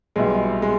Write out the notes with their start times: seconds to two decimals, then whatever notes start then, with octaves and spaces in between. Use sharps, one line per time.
0.16 B1 A#2 G3 G#3 B3 E4
0.62 G#3